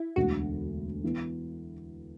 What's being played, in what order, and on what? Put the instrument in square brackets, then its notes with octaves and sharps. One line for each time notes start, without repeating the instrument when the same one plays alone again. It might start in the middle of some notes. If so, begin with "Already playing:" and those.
Already playing: [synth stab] E4
[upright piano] E1 D2 D3 [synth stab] F#4
[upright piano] E3 B3